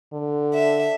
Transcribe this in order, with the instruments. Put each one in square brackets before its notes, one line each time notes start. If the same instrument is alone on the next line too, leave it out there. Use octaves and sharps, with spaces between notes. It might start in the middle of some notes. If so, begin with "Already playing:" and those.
[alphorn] D3
[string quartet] E5